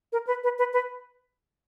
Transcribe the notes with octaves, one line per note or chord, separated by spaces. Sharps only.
A#4
B4
B4
B4
B4